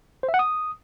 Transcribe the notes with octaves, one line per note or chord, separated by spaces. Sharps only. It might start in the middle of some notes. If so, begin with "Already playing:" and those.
C5
E5
F#5
D#6